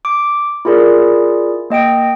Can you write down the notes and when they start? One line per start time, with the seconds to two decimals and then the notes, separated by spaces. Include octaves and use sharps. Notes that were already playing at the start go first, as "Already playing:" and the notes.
0.05 D6
0.65 E4 F4 G#4 A#4 D5
1.70 A#3 D#5 G5 D7